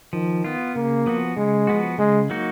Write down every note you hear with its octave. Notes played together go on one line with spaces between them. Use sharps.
D#3 F3
B3 F4
C#3 A#3
F3 B3 F#4
C#3 G#3
F3 B3 F#4
C#3 G#3
F#3 A#3 D#4 F#4